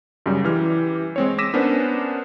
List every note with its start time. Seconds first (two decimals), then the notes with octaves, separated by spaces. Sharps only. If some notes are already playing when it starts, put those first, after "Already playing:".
0.26 F#2 C#3 G3
0.44 E3 G4 F6
1.16 G#3 C4 C#5
1.38 D6 E6 A#6 B6 D#7 E7
1.54 B3 C#4 D4 A#4 C5